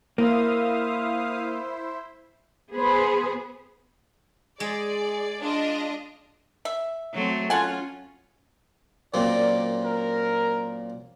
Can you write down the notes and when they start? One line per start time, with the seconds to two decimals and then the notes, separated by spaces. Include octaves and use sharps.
0.18 A#3 E4 C5 E5 F5 D#6
2.71 B3 G#4 B4 C5
4.60 G#3 G#4 D5
5.41 D4 F4 D#5
6.65 E5
7.14 F#3 A3 C4
7.50 C#4 F4 A4 F#5 G#5
9.14 F#2 A#2 C4 D5
9.84 A#4